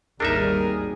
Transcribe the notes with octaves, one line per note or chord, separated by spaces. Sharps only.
G#1 D#2 G3 D4 D#4 G#4 A#4 E5